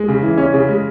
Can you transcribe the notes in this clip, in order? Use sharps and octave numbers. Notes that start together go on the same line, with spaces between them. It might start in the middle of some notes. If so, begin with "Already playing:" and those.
Already playing: G#3
C#3
E3
C#4
C#3
G#3